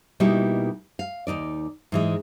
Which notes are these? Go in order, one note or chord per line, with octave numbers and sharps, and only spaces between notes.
B2 G3 A#3 D#4 E4 F#4
F5
D#2 B2 D#4 D5
G#2 E3 G#3